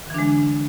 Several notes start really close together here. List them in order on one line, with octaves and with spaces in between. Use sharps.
D3 E3 D4 G#3